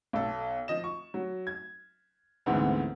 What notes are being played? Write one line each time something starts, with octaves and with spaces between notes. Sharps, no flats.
B1 A4
F3 D#5 E7
C#6
F#3
G#6
D2 G#2 D3 E3 B3 C4